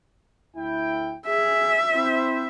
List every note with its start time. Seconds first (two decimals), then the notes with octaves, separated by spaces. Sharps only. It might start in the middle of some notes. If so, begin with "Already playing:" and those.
0.56 D2 E4 G5
1.26 G#4 E5
1.93 C4 E4 C5